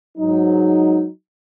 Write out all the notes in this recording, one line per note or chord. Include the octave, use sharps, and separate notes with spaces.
G#2 F#3 D#4